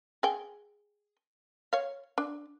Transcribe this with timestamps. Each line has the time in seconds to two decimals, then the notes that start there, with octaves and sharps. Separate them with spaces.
0.23 G#4 G5
1.73 C#5 F5
2.18 D4